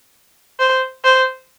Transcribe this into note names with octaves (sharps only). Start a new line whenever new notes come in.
C5
C5